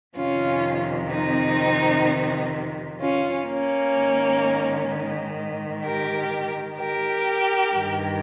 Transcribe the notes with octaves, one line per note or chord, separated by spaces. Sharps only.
F2 C3 D#3 C#4 F4
C4 D#4
C#4 F4
A#3 C#4
G#2 D#3
G4 A#4
G4 A#4
G2 D#3